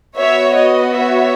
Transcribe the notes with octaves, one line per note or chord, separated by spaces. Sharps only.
B3 F#4 C#5 E5
D#5
C#5 E5